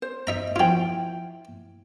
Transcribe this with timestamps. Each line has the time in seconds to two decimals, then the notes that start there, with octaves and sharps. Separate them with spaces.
0.02 C5
0.27 D#4 E5 A#5
0.56 F3 E4 F4 G5